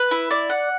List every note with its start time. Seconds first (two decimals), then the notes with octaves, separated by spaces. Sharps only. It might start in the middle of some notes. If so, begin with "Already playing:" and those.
Already playing: B4
0.11 E4
0.30 D5
0.49 F#5